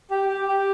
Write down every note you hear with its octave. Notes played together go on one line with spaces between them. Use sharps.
G4
G4
G4